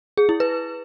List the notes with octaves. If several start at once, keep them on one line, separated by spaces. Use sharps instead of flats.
G#4
E4
B4